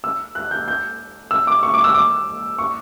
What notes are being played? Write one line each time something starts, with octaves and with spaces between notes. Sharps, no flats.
E6
F#6
G6
G6
E6
D6
C#6
D6
E6
D6
C#6